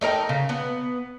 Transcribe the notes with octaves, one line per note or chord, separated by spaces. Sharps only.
A3 D#4 A#4 G5
C#3
B3